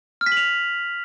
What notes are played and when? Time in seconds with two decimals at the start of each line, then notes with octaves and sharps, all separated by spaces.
0.21 F6
0.26 B6
0.32 F#7
0.37 F7